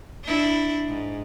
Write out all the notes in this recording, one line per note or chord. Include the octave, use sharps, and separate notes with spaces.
D4 E4
G#2